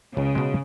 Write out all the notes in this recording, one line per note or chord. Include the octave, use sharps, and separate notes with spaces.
C#2 C#3
B2 G#3